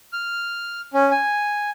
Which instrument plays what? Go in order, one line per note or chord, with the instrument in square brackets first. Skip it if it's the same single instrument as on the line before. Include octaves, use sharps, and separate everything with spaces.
[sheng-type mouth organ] F6
C#4
G#5